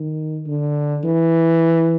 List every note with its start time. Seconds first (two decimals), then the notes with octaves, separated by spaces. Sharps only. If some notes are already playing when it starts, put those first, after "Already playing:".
Already playing: D#3
0.47 D3
1.04 E3